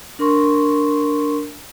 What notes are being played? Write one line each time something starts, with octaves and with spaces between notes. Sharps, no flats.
D4 A#4 C6 C#6